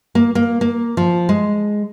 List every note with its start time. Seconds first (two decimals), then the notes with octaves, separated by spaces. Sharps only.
0.15 A#3
0.35 A#3
0.61 A#3
0.97 F3
1.29 G#3